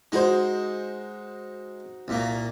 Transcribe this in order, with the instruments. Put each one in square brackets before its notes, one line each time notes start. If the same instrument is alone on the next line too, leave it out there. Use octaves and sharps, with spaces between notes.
[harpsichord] G#3 G#4 [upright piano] D#4 F#4 C5
[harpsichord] C2 A#2 A#3